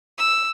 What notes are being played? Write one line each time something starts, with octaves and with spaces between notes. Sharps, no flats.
E6